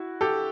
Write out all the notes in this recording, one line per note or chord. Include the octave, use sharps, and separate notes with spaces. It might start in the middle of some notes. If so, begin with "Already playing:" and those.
Already playing: E4 F#4
G4 A4